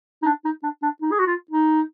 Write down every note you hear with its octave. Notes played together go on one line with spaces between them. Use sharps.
D#4
D4
D#4
D4
D4
D#4
G#4
F#4
F4
D#4